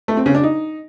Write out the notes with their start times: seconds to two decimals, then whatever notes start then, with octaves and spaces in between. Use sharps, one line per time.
0.08 A3
0.17 C4
0.26 C#3
0.35 D4
0.43 D#4